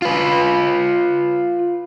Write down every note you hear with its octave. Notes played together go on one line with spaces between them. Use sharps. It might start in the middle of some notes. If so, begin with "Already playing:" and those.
F4 B4